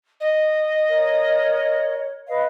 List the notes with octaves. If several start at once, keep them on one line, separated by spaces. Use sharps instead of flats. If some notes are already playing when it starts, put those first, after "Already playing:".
D#5
A#4 C#5
B4 D#5 F5